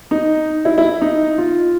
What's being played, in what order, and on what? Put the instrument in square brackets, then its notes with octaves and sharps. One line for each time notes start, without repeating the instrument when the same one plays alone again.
[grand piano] D#4
E4
E4
D#4
F4